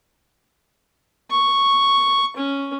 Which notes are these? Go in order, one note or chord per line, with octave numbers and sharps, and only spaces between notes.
C#6
C#4